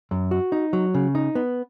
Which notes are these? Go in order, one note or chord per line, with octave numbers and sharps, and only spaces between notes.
F#2
F#4
D#4
F#3
C#3
D#4
B3